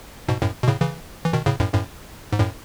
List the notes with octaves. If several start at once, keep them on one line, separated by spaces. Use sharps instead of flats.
G#2 B2
F#2 A2
B2
A2 C#3
C#3 E3
E3
B2 D#3
A2 C#3
F#2 A2
F#2 A2
G#2
F#2 A2